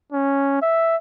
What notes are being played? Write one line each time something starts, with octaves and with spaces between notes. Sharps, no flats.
C#4
E5